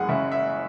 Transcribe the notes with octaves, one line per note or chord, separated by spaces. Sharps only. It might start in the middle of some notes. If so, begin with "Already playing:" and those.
Already playing: F#1 F#2 G#4 F#5
C#3 E5
E5